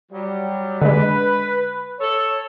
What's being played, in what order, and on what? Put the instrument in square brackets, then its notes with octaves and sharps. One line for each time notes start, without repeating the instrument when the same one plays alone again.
[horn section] F#3 G3
[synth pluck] D3 G#3 [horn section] B4
[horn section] A4 C#5